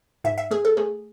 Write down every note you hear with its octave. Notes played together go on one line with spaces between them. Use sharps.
G#2 E5
E5
A3 G#4
A4
A3 G#4